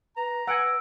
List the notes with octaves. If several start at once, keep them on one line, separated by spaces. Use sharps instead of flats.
B4 A#5
B4 F#5 G#5 E6 A#6 D7